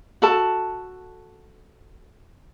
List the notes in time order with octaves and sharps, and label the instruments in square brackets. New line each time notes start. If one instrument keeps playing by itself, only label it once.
[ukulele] F#4 A4 A5